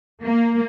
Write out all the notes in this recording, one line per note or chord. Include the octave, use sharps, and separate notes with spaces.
A#3